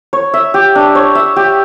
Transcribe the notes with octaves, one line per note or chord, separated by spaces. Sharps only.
C#5
E5
G4
D4
C#5
E5
G4